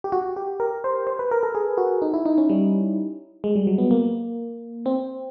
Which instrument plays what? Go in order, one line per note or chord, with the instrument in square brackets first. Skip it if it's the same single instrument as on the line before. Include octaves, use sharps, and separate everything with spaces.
[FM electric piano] G4
F#4
G4
A#4
C5
C5
B4
A#4
A4
G#4
F#4
D#4
E4
D#4
C#4
G3
G#3
G3
F#3
B3
A#3
C4